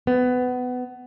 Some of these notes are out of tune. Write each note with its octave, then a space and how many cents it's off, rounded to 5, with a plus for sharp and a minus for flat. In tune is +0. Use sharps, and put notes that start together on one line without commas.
B3 +20